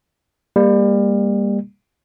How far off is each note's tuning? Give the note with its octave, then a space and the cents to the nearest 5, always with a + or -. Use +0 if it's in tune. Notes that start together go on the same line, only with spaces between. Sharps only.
G3 +30 A#3 +0